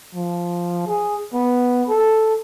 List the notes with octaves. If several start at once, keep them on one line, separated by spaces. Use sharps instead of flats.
F3
G#4
B3
A4